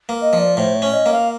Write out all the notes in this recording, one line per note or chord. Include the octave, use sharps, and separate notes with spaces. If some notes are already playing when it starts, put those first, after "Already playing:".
A#3
D#5
F3
D5
A2 C5
C#5
C#4
D#5
A#3
F5